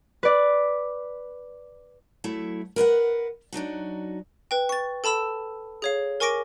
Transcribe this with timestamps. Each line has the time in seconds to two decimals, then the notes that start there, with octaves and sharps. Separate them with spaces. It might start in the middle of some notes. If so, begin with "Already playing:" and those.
0.23 B4 D5
2.24 F#3 A3 E4
2.76 A#4 B4 D5 F#5
3.53 F#3 D4 D#4 F#4
4.51 B4 G5
4.69 C#6 A6
5.04 A4 A5 B5 E6 E7
5.82 G#4 C#5 F5
6.20 A#4 G#5 C#6 D6 A#6 D7